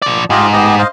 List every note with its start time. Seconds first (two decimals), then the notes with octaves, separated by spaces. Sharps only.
0.02 F3 D5
0.30 G#2 F4 G4 D#5
0.53 B3 G4 D#5
0.79 C5 D#5 F5